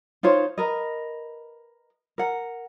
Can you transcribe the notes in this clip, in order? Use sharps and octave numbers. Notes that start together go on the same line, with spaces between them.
D#4 F4 C5 C#5
A#4 B4 D#5
A#4 F#5